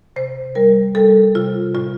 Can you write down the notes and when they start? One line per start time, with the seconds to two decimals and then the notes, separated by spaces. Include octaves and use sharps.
0.16 C3 C5
0.55 G3 A#4
0.95 G3 A4
1.35 C3 F4
1.75 A2 F4